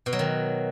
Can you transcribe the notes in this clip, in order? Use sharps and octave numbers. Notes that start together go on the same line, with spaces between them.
B2
F#3
D#3